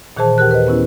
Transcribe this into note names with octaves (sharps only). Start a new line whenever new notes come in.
A#2 D#3 E3 G#4 C5 A5
D#2 E3 G4 A#4 F#6
B4 D#5
B3 C#4 E4